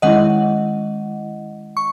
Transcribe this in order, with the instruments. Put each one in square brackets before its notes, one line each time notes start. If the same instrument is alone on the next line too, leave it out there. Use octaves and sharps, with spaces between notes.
[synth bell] D#3 G#3 C#4 E4 D#5 F#5
C#6